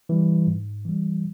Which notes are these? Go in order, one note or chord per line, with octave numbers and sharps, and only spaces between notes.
E3 G3
G#2
E3 G3